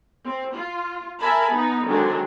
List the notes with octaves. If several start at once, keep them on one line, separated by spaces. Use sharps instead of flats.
C4
F4
A#4 E5 G#5 A5 B5
B3 D#4
D3 D#3 F#3 G#3 C4 D4